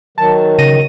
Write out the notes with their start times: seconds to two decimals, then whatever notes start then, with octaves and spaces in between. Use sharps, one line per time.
0.18 D#3 F#3 A5
0.59 C#3 A#6 D#7